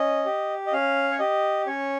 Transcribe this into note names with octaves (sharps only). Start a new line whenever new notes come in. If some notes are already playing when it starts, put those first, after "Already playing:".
Already playing: C#4 D#5
G4
D#5
C#4 F5
C#5
G4 D#5
C#4 C#5